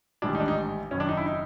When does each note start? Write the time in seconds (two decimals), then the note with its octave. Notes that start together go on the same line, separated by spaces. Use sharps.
0.22 A1 G#2 D#3 G3 D4
0.35 D#4
0.40 D4
0.48 D#4
0.91 F#1 F#2 D#3 C#4
1.00 D4
1.09 D#4
1.17 E4
1.26 D#4